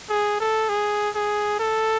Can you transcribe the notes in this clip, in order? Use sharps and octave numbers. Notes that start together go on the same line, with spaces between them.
G#4
A4
G#4
G#4
A4